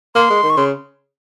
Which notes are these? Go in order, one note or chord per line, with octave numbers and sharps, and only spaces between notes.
A#3 C6
G#3
D#3
C#6
C#3 C6